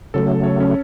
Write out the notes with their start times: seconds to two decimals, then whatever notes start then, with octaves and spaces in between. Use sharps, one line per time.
0.14 C#3 F#3 A3 A4
0.44 C#5
0.60 C#4